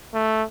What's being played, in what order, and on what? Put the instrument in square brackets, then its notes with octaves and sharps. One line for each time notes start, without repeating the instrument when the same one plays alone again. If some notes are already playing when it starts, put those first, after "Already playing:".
[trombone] A3